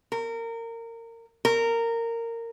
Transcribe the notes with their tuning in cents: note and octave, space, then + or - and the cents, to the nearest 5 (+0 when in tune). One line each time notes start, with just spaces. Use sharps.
A#4 -25
A#4 -15